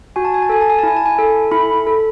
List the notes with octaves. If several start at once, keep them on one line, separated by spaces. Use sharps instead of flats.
F#4 G#5
A5
G#5
A5
A4 G#5
A5
G#5
A5
E4 G#5
A5
G#5
A4
E4 B5
A4